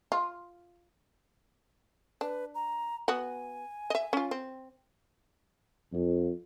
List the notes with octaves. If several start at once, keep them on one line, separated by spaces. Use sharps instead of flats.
F4
D4 B4
A#5
B3 F#4 G#5
D#5 E5
C#4 F4
C4
F2